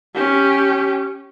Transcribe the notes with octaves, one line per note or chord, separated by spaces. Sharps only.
C#4 G4